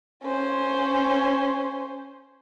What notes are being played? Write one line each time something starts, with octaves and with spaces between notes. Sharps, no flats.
C#4 C5